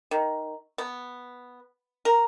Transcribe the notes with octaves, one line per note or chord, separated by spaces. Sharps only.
D#3
B3
A#4